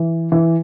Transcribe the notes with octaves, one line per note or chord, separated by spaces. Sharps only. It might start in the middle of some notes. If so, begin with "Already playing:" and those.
Already playing: E3
E3